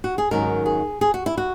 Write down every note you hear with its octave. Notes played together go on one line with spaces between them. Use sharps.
F#4
G#4
G#2 D#3 F#3 C#4 A#4
G#4
G#4
F#4
E4
F#4